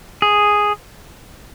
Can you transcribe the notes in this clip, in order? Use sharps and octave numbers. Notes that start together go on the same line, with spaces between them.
G#4